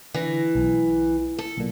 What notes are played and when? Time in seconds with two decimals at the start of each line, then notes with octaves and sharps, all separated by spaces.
0.14 D3 E3 A#6
0.55 B1
1.38 A4
1.57 B1 A#2